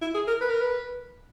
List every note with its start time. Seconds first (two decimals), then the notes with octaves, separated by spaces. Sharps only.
0.01 E4
0.14 G#4
0.28 A#4
0.41 B4
0.50 A#4
0.61 B4